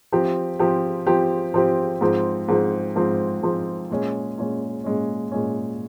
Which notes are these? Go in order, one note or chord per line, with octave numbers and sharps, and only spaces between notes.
F3 C4 G4
F3 C4 G4
F3 C4 G4
F3 C4 G4
G#2 F3 C4
G#2 F3 C4
G#2 F3 C4
G#2 F3 C4
A#2 G#3 C#4
A#2 G#3 C#4
A#2 G#3 C#4
A#2 G#3 C#4